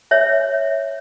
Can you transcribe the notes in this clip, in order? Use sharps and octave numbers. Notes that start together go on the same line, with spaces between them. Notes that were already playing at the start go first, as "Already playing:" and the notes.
C#5 E5